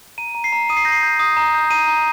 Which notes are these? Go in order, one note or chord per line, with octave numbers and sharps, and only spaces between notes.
A#5 D#7
A#5
C7
A#5
D#6 D#7
C7
G6 A#6
C7
G6
D#6
A#5
G6
A#5 D#7
A#5